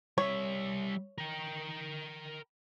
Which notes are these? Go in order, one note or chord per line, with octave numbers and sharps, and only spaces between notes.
G3 C#5 E5
A#4 G5